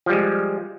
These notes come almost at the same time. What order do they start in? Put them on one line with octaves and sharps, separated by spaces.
F3 G3 G#3